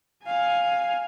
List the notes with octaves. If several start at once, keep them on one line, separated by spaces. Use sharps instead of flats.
F5 G#5